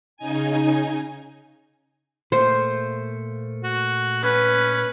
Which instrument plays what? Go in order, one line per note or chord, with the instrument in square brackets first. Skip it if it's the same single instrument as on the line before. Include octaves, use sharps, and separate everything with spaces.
[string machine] C#3 D#4 G#5
[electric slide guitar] A#2 A3 A#3 [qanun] C5
[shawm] F#4
[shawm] C#4 [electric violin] B4